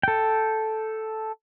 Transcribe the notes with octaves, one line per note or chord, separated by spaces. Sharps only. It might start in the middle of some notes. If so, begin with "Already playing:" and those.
A4 G5